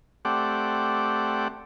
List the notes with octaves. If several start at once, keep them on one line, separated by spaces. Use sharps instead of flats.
A3 C4 G4 D5 F#5